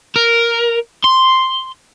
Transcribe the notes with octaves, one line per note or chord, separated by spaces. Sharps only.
A#4
C6